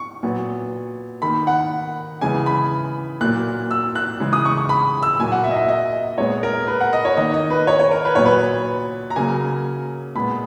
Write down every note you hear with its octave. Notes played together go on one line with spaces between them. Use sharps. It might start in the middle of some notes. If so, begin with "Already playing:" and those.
Already playing: C#6
A#2 F#3 B3
D#3 A#3 B5
F#5
C#3 E3 G#3 B3 G#5
B5
A#2 F#3 A#3 F#6
E6
F#6
C#3 E3 G#3
D#6
C#6
C#6
B5
E6
A#2 F#3 A#3 G#5
F#5
E5
D#5
E5
D#5
A#2 G#3 B3 C#5
A#4
B4
F#5
D#5
C#5
D#3 A#3 D#5
D#5
B4
C#5
C#5
A#4
B4
A#2 F#3 B3 C#5
B4
A#5
C#3 F#3 A#3 G#5
A#2 G#3 B3 B5